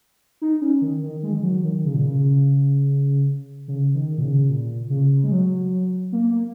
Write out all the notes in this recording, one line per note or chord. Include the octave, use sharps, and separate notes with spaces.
D#4
C#4
D#3
D#3
G#3
D#3
F#3
D#3
C#3
A#2
C#3
C#3
D#3
A#2
C#3
A#2
C#3
G#3
F#3
A#3
A#3